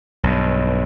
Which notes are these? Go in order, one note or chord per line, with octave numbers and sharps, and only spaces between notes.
B1 G2